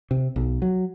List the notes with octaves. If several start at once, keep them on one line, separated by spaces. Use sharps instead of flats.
C3
B1
F#3